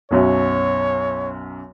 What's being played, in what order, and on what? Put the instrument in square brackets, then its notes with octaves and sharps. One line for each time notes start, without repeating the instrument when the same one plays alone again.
[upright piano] B1 F#2 F#3 [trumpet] C#5